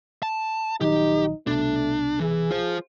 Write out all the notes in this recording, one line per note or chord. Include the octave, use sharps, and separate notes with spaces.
A5
A#1 D#3 F#3 D#4 G4
C2 B2 A3 D4
E3 G#4
F4 C5